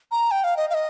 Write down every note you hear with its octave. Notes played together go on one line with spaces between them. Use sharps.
A#5
G5
F5
D#5
F5
D#5